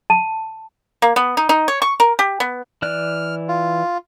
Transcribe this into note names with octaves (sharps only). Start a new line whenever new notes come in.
A5
A#3
B3
D#4
D#4
C#5
C#6
A#4
G4
B3
E3 D5 F6 F#6
F4